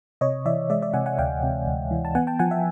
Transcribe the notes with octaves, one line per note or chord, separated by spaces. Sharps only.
C3 C#5 D#5
E3 D5 E5
G#3 D5 E5
D5 E5
C3 F#5 G#5
F#5 G#5
D2 F5 G5
C3
D2
E3
A5
B3 F#5 G#5
G5 A5
F3 F#5 G#5
E5 F#5